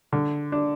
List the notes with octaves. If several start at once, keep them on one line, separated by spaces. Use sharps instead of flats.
D3
D4